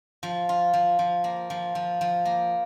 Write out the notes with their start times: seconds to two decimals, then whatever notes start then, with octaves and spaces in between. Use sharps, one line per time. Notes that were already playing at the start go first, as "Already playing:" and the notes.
0.23 F3
0.49 F4
0.74 F3
0.99 F3
1.24 A#3
1.50 F3
1.75 F3
2.01 F3
2.25 A#3